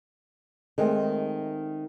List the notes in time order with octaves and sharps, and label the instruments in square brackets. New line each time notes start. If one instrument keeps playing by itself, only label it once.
[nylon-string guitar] D#3 G#3 A3 C4